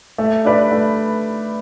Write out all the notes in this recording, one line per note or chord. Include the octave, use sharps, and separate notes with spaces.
A3
D4 B4 D5
A3